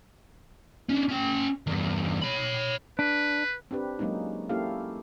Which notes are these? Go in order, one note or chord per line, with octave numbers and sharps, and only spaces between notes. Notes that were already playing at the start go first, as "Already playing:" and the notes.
C#4 D4
C#4 G5
E2 G2
C#5 B5
D4 B4
C4 D4 G4 B4
F#3 G#3 A#3 C#4 D#4
A#3 C#4 E4 G4 A4 F5